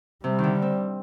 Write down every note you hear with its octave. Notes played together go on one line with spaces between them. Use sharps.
C3 G3
D3 D#3
C4